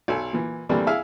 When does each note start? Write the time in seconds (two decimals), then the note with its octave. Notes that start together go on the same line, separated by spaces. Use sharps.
0.08 B1 A4 G#5
0.33 A#2 E3
0.69 E3 G3 A3 A#3 C4 D4
0.87 E4 G#4 E5 F5 G#5